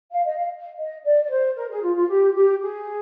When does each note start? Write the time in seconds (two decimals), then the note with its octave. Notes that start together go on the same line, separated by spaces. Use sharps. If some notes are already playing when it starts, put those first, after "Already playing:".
0.11 F5
0.25 D#5
0.37 F5
0.77 D#5
1.04 D5
1.23 D5
1.30 C5
1.55 A#4
1.70 G#4
1.82 F4
1.95 F4
2.09 G4
2.35 G4
2.61 G#4